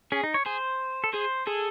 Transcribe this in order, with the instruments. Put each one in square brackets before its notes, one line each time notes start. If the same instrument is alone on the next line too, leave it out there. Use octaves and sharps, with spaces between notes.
[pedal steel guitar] C#4 [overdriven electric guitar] G#4
[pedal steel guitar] D#4
C#5
[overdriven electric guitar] G#4 [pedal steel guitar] C5
[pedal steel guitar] A4
[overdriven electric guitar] G#4 [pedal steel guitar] C5
[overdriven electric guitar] G#4 [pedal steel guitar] A4